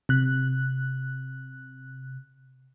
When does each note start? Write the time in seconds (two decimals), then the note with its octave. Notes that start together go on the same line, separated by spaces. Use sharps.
0.09 C3 F#6